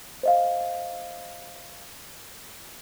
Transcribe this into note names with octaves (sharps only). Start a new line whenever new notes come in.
C5 D#5 F5